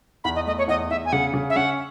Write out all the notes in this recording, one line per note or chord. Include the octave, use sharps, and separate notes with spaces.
E2 B5
D#5
A3 D#5
C#5
E2 D#5
E2 E5
G#5
C#3 F#5
C#3
E5
C#4 F#5